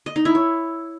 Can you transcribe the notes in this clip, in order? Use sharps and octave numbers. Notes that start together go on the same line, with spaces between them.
D#5
D#4
E4
C#5